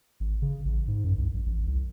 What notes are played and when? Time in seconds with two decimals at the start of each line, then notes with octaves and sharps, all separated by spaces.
0.20 G#1
0.42 C#3
0.65 A1
0.88 G#2
1.04 F#2
1.18 C2
1.34 A#1
1.46 A1
1.67 C2